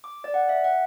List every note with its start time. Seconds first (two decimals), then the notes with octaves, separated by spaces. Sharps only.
0.04 D6
0.24 D5
0.34 F#5
0.49 E5
0.64 F#5